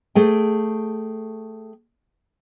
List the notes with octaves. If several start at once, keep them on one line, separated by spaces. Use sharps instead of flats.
A3 G#4 G5